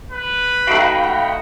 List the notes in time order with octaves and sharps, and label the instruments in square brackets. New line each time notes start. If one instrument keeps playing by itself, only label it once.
[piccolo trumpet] B4
[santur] A3 D#4 F#4 [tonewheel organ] F5 G5 B5
[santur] F#5